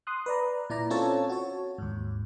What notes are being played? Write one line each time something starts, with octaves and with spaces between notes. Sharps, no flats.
C6 D#6 F#6
B4 D5 A#5
A#2 E4 D5 A#5
C4 C#4 F4 A4 C#5 A5
F#4 C#5
D#2 G#2